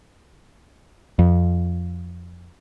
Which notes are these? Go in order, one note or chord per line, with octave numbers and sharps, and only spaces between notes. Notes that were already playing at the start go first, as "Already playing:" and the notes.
F2